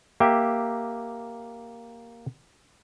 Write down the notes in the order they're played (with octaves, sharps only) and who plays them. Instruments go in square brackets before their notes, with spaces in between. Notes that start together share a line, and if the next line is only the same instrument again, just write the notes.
[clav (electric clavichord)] A#3 G4 E5 G5